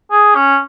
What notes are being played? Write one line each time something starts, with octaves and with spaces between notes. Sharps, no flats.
G#4
C#4